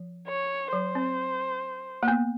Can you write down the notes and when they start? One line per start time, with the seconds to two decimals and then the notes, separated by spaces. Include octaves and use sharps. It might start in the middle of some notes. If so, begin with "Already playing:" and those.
Already playing: F3
0.28 C#5
0.73 F#3 C5
0.95 C4
2.03 A#3
2.08 B3